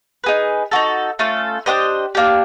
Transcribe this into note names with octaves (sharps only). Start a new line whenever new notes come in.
D#4 G#4 B4
D#4 F#4 A4
A3 C#4 F4 A4
D4 G4 C5 D#5
A#3 D4 G4